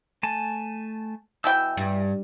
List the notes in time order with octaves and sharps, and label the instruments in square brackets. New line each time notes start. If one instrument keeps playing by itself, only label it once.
[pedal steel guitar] A3 G#5 A5
[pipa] B2 E3 G5 [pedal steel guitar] E6
[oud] G2